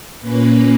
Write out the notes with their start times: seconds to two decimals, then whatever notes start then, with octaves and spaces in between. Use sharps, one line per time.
0.21 A#2 A#3 C#4 B4